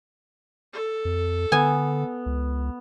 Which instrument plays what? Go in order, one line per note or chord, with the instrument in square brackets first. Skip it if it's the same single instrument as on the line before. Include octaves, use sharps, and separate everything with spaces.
[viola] A4
[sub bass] F2
[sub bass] D3 [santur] B3 [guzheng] G#5
[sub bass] C#2